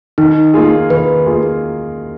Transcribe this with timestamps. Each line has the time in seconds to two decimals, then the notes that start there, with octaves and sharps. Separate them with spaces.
0.18 D#3 D#4
0.54 A#3 F4 G#4
0.90 D#3 B4
1.26 A#3 F4 G#4